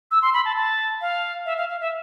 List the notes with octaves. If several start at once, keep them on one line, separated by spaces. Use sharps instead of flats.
E6
C6
B5
A5
A5
F5
E5
F5
F5
E5